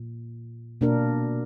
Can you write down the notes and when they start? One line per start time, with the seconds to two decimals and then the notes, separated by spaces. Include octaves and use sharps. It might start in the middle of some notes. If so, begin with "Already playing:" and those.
Already playing: A#2
0.81 B2 A#3 D4 A#4